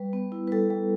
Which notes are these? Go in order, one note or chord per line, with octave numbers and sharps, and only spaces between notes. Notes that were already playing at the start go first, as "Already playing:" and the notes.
Already playing: G3 B4
B3
E4
B4
G3 A4
G3